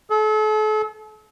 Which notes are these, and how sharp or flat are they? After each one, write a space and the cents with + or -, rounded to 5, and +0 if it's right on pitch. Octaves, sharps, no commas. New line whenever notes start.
A4 -40